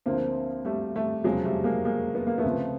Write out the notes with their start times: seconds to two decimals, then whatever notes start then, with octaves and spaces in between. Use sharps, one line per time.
0.06 D2 D3 F3 A#3 C4
0.65 G3 A3
0.96 G3 A3
1.24 F1 E2 C#3 F3 F#3 G#3
1.44 G3 A3
1.64 G#3 A#3
1.85 G#3 A#3
2.15 B3
2.27 A#3
2.38 A3 B3
2.44 C#2 C3 F3